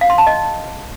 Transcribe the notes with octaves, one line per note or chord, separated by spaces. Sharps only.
F5
C6
A5
D#5